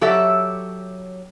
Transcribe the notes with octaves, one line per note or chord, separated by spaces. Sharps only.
F#3 G4 A4 C#5 D5 E5